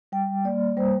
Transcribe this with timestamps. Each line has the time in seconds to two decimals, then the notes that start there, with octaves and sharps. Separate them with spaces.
0.12 G3 G5
0.44 A#3 D5
0.77 G3 C5